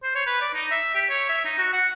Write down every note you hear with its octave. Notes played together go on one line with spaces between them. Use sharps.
C5
C#5
B4
D5
D#4
E5
G4
C#5
E5
D#4
F#4
F#5